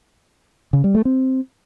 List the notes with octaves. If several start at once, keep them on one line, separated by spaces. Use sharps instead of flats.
C#3
G3
A3
C4